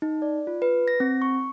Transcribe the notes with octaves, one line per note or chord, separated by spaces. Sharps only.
D#4
D5
F4
B4
A#6
C4
C#6